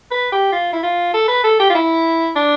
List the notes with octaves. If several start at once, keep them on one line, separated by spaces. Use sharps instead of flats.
B4
G4
F4
E4
F4
A4
B4
A4
G4
F4
E4
D4